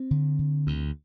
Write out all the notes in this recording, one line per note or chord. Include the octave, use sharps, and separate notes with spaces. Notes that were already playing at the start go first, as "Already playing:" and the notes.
Already playing: C4
D3
D3
D2